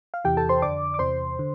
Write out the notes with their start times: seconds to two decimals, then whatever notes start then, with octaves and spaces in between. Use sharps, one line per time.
0.14 F5
0.25 E2 C3 E3 G4 G5
0.37 A4 A5
0.49 C5 C6
0.62 F2 D3 D5 D6
0.94 D6
0.99 E2 C3 E3 C5 C6
1.39 D3